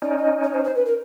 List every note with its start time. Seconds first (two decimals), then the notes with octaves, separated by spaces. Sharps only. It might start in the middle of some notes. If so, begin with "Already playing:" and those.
0.02 C#4 D#4 D5
0.18 D#5
0.43 C#5
0.54 C5
0.64 C5
0.75 B4
0.86 A#4